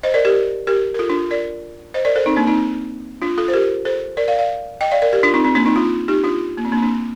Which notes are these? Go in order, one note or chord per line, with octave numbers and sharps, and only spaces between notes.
C5 D#5
A#4 D5
G4 A#4
G4 A#4
A#4
F4 A4
D4 F4
A#4 D5
C5 D#5
A#4 D5
A4 C5
C4 D#4
A#3 D4
C4 D#4
D4 F4
F4 A4
C5
G4 A#4
A4 C5
A#4 D5
D5 F5
D5 F5
D#5 G5
D5 F5
A#4 D5
G4 A#4
D4 F4
C4 D#4
C4
A#3 D4
C4 D#4
D4 F4
D#4 G4
D4 F4
A#3
C4
A#3 D4
C4
A#3 D4